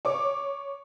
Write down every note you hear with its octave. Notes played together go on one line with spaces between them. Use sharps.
C#5 D6